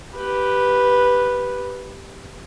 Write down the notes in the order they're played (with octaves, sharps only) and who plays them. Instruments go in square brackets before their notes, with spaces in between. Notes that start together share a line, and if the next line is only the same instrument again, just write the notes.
[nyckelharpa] G4 B4